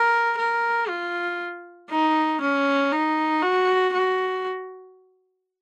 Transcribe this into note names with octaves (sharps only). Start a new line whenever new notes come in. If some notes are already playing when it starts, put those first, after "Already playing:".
Already playing: A#4
A#4
F4
D#4
C#4
D#4
F#4
F#4